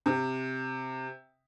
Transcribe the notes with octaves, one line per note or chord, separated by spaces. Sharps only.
C3